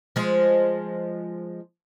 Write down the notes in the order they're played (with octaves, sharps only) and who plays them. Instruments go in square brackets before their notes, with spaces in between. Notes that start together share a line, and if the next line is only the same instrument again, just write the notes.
[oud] F3 G#3